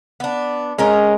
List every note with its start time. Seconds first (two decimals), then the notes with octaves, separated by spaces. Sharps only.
0.20 B3 D4
0.79 G#3 C#4 A#4 D#5